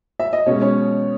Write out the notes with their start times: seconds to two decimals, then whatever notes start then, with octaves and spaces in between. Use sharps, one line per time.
0.20 E5
0.33 D#5
0.46 B2 G#3 C#4 C#5
0.62 C#4 C#5